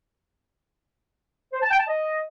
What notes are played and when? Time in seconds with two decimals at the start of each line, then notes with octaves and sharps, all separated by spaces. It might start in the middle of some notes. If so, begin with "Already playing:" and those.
1.53 C5
1.62 A5
1.70 G5
1.79 A5
1.87 D#5